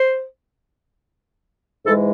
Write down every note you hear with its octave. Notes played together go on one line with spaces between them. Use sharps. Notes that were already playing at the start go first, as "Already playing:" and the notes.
Already playing: C5
G#2 E3 G#3 A4